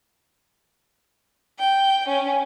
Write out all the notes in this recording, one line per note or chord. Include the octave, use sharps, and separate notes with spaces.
G5
C#4